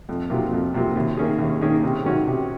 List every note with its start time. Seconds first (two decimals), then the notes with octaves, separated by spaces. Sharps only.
0.09 F2
0.30 C3 F#3 A#3 F4
0.52 F2
0.74 C3 F#3 A#3 F4
0.96 D#2
1.17 D#3 A#3 C#4 G#4
1.39 D#2
1.61 D#3 A#3 C#4 G#4
1.83 C3
2.04 D#3 F#3 C#4 F#4
2.27 C3